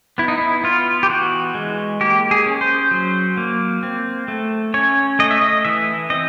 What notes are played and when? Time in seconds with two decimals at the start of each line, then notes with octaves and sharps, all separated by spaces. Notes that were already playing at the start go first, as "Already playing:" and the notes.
0.18 B3 E4
0.28 D#4
0.38 E4
0.64 B3 F4
1.03 G4
1.09 E3 F#4
1.55 G#3
2.01 A#3 G4
2.31 G#4
2.46 C#4
2.61 C5
2.91 F#3
3.37 A#3
3.83 C4
4.28 A3
4.74 C#4 C#5
5.19 A3 D#5
5.31 E5
5.41 D#5
5.65 E3 E5
6.10 C4 D#5